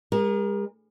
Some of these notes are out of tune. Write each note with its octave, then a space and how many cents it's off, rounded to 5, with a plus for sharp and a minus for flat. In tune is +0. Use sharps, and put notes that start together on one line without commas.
G#3 -40 A#4 +25